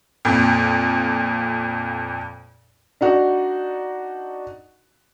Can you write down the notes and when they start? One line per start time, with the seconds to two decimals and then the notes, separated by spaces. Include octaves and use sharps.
0.25 F2 A#2
3.01 D4 D#4 F#4